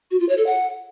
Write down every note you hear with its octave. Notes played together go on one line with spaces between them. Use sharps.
F#4
F4
C#5
A4
F#5